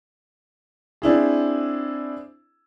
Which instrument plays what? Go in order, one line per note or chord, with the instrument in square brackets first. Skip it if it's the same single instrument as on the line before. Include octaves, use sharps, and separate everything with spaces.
[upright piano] C4 D4 E4 G#4